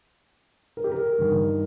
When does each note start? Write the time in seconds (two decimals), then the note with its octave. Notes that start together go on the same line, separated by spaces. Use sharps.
0.77 A#4
0.84 G4
0.92 A#4
1.18 G2 D#3